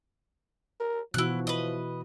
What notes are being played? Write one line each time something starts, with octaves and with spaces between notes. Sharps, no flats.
A#4
B2 E3 F3 E4 F#4 F#6
E4 B4 D#5